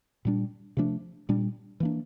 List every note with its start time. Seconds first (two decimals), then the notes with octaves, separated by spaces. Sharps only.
0.25 A#2 G3 D4
0.77 C3 F3 A3 D4
1.29 A#2 G3 D4
1.80 E3 A#3 D4